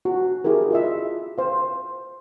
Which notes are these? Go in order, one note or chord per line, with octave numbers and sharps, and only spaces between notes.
F#4
E4 G4 G#4 A#4
F4 D#5 E5
C5 F5